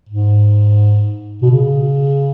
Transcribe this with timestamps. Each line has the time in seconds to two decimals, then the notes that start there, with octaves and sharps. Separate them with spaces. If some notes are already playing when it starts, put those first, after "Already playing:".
0.09 G#2
1.42 B2
1.51 C#3